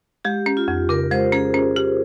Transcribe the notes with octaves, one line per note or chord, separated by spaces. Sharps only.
G#3 G4
C#4
F4
F2
C#3 A#4
G#3 C5
C#4 G#4
C#4
G4